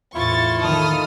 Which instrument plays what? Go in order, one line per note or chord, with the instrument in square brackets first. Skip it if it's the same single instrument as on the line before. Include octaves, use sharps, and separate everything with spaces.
[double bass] E2 A2 [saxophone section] E4 F4 [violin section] C#6 A6
[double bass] D#3 [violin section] A4 D#6 F6